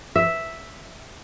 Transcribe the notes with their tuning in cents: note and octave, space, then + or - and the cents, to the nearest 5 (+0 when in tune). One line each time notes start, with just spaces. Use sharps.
E5 +0